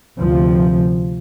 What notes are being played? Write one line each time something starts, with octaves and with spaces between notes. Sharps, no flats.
D2 C3 F3